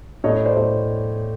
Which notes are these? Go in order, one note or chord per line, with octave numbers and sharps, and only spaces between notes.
A2 C#5 D#5
C5 D5
A2